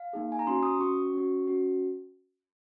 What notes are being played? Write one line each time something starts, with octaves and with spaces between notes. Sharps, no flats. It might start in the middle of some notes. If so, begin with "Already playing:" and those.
Already playing: F5
A#3 D#4 G#4
G#5
A#5
C#4 F#4 C6
D#6
C#4 F#4 C#6
C#4 F#4
C#4 F#4